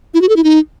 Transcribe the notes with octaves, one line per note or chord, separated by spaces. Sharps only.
E4
F#4
A4
E4
D#4